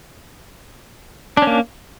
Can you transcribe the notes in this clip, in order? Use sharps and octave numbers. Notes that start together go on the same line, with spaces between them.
A#3 C#4 D4